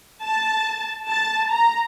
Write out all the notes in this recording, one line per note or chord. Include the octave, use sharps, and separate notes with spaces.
A5
A5
A#5